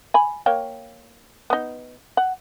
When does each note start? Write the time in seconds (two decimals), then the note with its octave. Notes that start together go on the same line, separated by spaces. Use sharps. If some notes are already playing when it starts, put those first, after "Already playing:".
0.14 G#5 B5
0.46 A#3 C#5 G5
1.50 B3 D#4
2.17 F#5